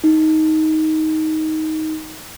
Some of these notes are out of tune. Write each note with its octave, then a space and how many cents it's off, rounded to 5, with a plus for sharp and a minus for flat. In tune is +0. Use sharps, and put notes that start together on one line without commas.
D#4 +15